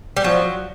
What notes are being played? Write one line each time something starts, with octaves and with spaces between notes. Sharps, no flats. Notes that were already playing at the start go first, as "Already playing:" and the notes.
G3
F3 F#3